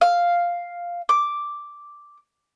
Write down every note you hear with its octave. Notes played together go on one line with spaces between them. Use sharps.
F5
D6